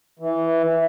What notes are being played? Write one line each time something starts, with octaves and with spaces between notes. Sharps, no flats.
E3